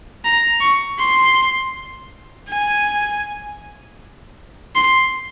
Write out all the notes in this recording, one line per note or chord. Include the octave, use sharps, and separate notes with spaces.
A#5
C#6
C6
G#5
C6